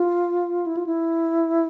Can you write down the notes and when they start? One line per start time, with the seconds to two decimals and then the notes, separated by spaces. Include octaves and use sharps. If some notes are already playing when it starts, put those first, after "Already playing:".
Already playing: F4
0.66 E4
0.77 F4
0.87 E4